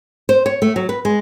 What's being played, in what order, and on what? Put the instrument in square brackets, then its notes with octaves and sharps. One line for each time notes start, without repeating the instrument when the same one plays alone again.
[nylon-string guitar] C5
C#5
A3
F#3
B4
G#3